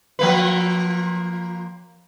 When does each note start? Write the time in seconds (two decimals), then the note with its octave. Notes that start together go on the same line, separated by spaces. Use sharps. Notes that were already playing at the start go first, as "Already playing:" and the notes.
0.19 F3 A#3 B4